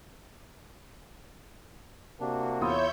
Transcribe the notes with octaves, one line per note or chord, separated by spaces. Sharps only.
C3 A#3 D4 F#4
E2 E4 F4 C#5 E5 F5 D#6 G6